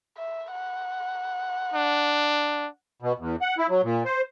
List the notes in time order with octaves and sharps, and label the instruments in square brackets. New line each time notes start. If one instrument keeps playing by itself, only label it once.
[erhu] E5
F#5
[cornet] D4
[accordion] B2
E2
F#5
E4
F#3
A#2
C5